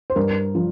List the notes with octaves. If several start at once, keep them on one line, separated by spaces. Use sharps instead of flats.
C5
G2 A#4
F3